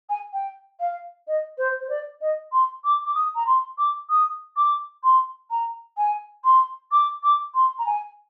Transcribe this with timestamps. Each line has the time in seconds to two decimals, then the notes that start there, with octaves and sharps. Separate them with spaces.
0.10 G#5
0.33 G5
0.80 F5
1.28 D#5
1.58 C5
1.81 C5
1.90 D5
2.21 D#5
2.52 C6
2.84 D6
3.05 D6
3.15 D#6
3.35 A#5
3.47 C6
3.78 D6
4.09 D#6
4.57 D6
5.04 C6
5.51 A#5
5.98 G#5
6.44 C6
6.92 D6
7.23 D6
7.54 C6
7.79 A#5
7.86 G#5